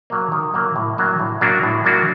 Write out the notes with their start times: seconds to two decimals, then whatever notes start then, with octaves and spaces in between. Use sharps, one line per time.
0.10 F#3 A#3
0.32 D#3
0.54 F#3 A#3
0.76 A2
0.98 F#3 A#3 D4 F#4
1.20 A2
1.41 F#3 A#3 D4 F#4
1.63 A2
1.85 F#3 A#3 D4 F#4